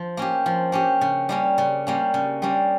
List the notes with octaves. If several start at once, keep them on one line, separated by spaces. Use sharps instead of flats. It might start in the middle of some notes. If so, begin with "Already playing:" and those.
Already playing: F3
A#3 C#4 G4
F3
A#3 C#4 G4
C#3
G3 A#3 C#4
C#3
G3 A#3 C#4
C#3
G3 A#3 C#4